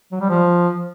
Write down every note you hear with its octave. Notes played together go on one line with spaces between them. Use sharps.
F#3
G3
F3